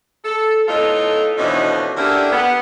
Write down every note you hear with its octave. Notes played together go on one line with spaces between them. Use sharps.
A4
A2 B3 D#4 F4 A4
B2 D3 E3 F3 C#4 D#4
D3 C#4 D4 E4 G4 A#4
B3